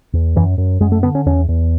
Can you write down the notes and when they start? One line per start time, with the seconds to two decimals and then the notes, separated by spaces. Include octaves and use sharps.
0.13 E2
0.36 F#2 E3
0.58 F#2
0.81 F#2 G#3
0.92 A3
1.03 D3 B3
1.15 C#4
1.26 E2 C#4
1.49 E2